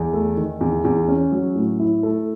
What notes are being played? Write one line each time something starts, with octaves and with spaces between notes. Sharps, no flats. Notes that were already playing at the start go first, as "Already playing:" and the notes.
Already playing: E2
A3
D#3
E2
E2
C#4
F#3
A2
E4
A3